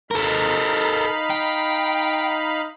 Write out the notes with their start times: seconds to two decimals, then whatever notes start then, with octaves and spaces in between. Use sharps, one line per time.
0.11 D#4 A4 A#4 F5 B5
1.30 G5